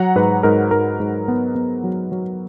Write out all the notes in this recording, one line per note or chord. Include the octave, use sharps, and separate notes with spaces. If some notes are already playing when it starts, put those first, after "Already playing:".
Already playing: F#3 F#5 A#5
G#2 B4
G#2 A#4
G#2 A#4
G#2
B3
B3
F#3
F#3